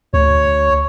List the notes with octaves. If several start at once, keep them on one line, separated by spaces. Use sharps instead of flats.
D2 C#5